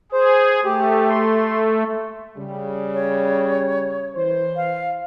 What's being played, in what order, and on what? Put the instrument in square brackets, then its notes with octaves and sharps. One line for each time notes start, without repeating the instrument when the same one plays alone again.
[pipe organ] G#4 [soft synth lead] C5
[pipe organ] A3 [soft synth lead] G4
[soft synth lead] C6
[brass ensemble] C#3 G3
[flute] C#5
[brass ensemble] E3 C5
[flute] F5